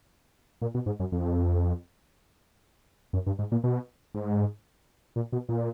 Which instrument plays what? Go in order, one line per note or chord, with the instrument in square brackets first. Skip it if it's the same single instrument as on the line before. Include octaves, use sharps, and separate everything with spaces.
[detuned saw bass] A#2
B2
G#2
F#2
F2
F#2
G2
G#2
A#2
B2
G#2
A#2
B2
A#2